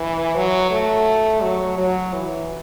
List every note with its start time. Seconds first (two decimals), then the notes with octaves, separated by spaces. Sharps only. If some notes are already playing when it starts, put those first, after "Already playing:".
Already playing: E3
0.35 F#3
0.71 A3
1.42 F#3
1.78 F#3
2.13 E3